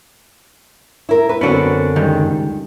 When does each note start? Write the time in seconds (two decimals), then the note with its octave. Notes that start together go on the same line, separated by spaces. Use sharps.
1.09 E4 A#4
1.29 B4
1.41 F#2 D3 B3 C4 D4 F#4
1.96 C#2 D#3 G3